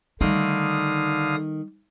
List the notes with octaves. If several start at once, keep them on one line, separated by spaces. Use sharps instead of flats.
D3 D#3 G3 A3 D#4 F5 D#6